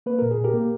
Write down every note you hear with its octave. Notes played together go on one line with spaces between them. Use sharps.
A#3 B4
A#2 A#4
G#4
A#2
G4 A#4
A#3